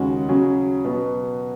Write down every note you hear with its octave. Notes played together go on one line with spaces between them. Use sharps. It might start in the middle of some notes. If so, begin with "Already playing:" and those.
Already playing: D#2 C#3 G#3 C#4 F#4
C#3 F#3 C#4
B2 F#3 B3